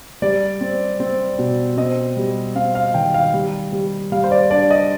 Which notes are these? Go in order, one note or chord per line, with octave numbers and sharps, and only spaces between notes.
G3 D5
C4
C4
B2
C4 D#5
G3
C4 F5
F5
D#3 G5
F5
G3
G3
G3 F5
C5
D5
D4 D5
D#5